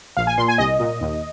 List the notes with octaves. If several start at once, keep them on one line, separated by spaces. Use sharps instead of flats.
A#1 F5
G#5
A#2 C6
G#5
C2 D#5
A#2
D#2